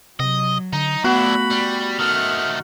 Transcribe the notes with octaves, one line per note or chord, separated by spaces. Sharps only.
C3 F#3 D#5
D3 D#4
A3 B3 D4 E4 F#4 B5
G3
D#3 A3 F#5 F6